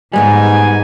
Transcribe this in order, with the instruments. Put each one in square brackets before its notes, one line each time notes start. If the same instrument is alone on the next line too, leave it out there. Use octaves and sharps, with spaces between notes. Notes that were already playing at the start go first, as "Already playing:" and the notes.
[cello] G#2 [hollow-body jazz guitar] G3 G#3 B3 [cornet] G#5